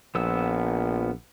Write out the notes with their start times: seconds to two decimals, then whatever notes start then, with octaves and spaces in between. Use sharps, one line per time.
0.15 A#1 F3 B3 E6